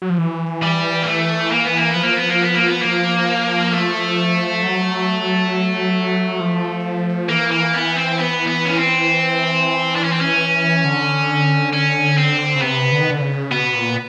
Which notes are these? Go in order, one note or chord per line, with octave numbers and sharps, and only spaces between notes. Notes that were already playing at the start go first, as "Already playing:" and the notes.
F#3
F3
E3
G3
A#3
A3
A#3
B3
A#3
B3
F3
A#3
B3
A#3
B3
A#3
B3
F3 A#3
A3
F#3
F3
E3 A#3
A#3
B3
C4
B3
B3
C#4
C4
D4
C#4
C4
C#4
D3
C#4
C4
C#3
C3 B3
D3
D#3
D3
C#3
B2 B3
A#2